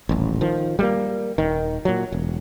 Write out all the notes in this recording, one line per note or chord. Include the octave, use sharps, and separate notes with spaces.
D#1 A1
D#3 F3
G3 G#3 A#3
D#1 D#3
A#2 F#3
E1